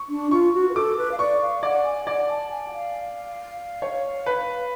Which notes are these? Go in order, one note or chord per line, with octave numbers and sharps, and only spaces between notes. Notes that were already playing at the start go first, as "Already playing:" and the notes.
Already playing: C#6
D4
F4 C#6
F#4
B4
A4 D6
B4
F5
D5 C#6
F5
D5 F#5
G#5
D5 F#5
A5
G#5
F#5
F5
C#5
B4